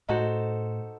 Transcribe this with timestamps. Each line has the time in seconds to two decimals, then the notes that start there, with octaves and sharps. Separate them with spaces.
0.09 A2 D#4 F#4 A4 C5